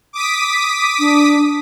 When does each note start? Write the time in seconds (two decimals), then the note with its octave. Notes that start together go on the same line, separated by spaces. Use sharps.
0.13 D6 D#6 B6
0.99 D4